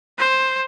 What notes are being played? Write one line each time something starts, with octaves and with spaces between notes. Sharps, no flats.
C5